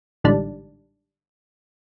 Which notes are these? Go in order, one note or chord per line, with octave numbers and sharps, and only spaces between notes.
A1 G#2 D3 G3 D4